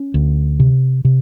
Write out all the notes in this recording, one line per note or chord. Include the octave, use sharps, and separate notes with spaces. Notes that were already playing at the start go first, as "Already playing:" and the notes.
Already playing: C#4
D2
C3
C3